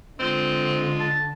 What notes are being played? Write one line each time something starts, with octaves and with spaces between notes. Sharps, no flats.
D3 G#3 C4 F4
A5